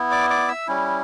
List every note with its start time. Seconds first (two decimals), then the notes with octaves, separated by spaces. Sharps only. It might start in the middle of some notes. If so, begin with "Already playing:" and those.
Already playing: B3 E4
0.12 D5 D6
0.30 D5 D6
0.48 E5 E6
0.67 G3 C#4 E4